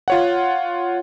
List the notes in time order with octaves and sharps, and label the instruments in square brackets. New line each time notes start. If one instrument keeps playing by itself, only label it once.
[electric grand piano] F4 C#5 F#5